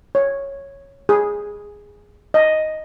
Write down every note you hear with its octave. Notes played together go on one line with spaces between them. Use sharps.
C#5
G#4
D#5